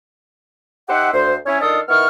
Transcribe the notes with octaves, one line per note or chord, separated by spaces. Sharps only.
D#4 G4 C5 E5 F#5
D2 C5
C#4 E4 C#5
D#3 D4 D#4 F4 A4 D#6
D#3 B3 E4 C#6 F6